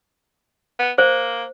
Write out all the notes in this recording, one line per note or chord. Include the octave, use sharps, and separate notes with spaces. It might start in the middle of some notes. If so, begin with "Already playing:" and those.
B3
A#3 C5